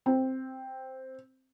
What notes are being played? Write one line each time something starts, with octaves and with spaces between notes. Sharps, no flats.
C4